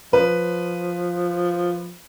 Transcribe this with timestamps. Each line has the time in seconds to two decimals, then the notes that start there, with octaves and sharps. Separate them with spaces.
0.13 F3 B4